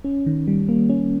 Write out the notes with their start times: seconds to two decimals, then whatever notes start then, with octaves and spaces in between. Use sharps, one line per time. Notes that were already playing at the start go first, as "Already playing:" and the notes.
0.04 C#4
0.26 D#3
0.47 G3
0.69 A#3
0.90 C#4